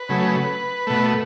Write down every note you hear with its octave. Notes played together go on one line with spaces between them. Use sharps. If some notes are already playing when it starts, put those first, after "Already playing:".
Already playing: B4
C#3 F#3 A3
B2 A3